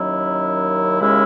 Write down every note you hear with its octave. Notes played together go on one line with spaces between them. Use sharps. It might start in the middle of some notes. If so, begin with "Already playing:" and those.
Already playing: D#2 D#3 F#3 C#4 E4
D#2 C#3 G#3 C#4 E4